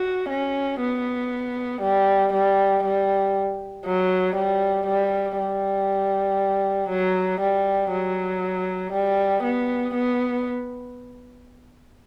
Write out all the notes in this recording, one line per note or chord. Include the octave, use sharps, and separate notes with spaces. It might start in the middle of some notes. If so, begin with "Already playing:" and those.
Already playing: F#4
C#4
B3
G3
G3
G3
F#3
G3
G3
G3
F#3
G3
F#3
G3
B3
B3